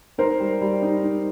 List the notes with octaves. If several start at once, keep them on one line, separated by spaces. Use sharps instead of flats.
D#4 A#4 C5
G3
G3
D#4
D#4